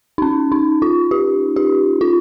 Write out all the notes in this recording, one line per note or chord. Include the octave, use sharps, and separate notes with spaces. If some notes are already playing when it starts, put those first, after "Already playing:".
D#4
C#4
D#4
F4
G4
G4
F4